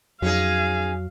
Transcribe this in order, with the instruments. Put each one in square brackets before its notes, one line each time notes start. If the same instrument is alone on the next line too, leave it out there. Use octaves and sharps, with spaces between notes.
[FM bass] F2 [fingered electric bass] F#3 [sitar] C#4 D#4 G#4 [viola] F5